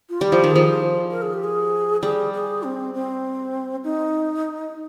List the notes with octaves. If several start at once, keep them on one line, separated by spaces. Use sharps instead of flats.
F4
G3 G4
F3
D#3
F3 G#4
A#4
G#4
G4
G#4
G3 G#4
G#4
C4
C4
D#4